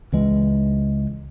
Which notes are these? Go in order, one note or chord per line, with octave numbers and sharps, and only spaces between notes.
C#2 E3 G#3